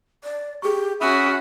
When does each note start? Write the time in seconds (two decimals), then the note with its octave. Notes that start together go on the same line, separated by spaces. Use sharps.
0.24 D5
0.62 G4 G#4 C#6
1.01 C#4 F#4 E5 B5 D#6